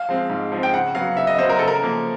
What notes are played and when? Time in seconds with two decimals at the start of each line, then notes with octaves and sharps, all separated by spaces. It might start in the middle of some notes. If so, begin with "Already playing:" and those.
Already playing: F5
0.09 F3 G#3 C4
0.30 G#2
0.52 F3 G#3 C4
0.63 G5
0.73 C#3 F#5
0.95 F#3 B3 F5
1.16 C#3 E5
1.27 D#5
1.38 F#3 B3 C5
1.49 A#4
1.59 C#3 A4
1.68 A#4
1.82 F3 A#3